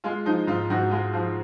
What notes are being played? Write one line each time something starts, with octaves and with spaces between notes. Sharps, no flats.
G#3 F4
F3 D#4
G#2 F4
G#2 F#4
G#3 F4
F3 F4